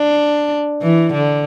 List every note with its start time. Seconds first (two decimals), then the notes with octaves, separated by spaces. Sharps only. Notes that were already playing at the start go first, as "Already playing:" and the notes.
Already playing: D4
0.82 E3
1.13 D3